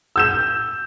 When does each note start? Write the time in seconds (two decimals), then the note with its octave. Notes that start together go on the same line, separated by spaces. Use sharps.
0.16 E6 G6 E7